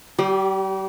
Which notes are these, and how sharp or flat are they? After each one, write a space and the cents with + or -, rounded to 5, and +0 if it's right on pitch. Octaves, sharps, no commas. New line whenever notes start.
G3 -35 G4 +0